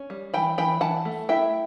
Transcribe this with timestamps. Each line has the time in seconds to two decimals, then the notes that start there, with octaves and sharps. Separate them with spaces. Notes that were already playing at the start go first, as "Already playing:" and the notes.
Already playing: C#4
0.10 G3
0.34 E3 G5 B5
0.58 E3 G5 B5
0.81 E3 F#5 A5
1.05 A3
1.29 E4 E5 G5